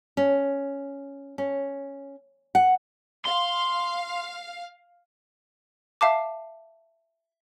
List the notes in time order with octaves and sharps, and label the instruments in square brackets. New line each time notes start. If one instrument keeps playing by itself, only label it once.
[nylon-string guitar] C#4
C#4
F#5
[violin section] F5 [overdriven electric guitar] C6
[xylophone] E5 F5 A5 D6